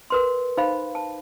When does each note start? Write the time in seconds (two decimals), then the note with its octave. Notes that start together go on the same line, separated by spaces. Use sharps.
0.10 A#4 B4 C6
0.57 D#4 C5 F5 B5
0.95 A5